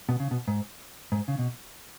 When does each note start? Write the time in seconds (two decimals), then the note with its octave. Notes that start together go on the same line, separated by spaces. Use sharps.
0.09 B2
0.20 C#3
0.31 B2
0.48 G#2
1.12 G#2
1.28 C#3
1.39 B2